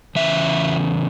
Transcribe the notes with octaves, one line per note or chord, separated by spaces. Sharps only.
E2 C#3 E3 E5